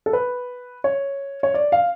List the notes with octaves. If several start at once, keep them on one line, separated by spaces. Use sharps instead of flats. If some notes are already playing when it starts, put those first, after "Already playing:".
A4
B4
C#5
C#5
D5
F5